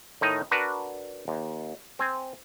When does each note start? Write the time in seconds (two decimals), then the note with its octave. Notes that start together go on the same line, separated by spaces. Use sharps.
0.21 A2 D#3 D#4 D#5
0.51 D4 F#4 A#4 B4
1.28 D#2
1.99 C4 G#5